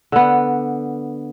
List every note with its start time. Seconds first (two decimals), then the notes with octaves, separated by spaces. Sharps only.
0.12 D3 B3